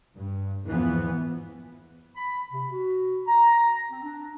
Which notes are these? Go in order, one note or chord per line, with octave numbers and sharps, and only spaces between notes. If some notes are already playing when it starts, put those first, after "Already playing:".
G2
E2 G#2 E3 F3 B3
B5
C3
F#4
A#5
C4
D4